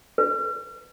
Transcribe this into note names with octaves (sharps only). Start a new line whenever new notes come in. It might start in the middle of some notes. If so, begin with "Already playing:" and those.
B4